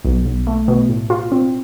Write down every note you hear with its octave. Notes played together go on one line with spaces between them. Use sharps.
B1
B1
A3
B2
A2
F4
C4